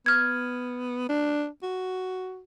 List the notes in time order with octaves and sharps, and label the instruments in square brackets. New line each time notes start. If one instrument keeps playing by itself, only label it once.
[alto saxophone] B3 [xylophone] F6 G#6
[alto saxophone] D4
F#4